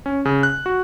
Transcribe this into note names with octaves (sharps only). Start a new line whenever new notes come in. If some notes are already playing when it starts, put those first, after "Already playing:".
C#4
C#3
F#6
F#4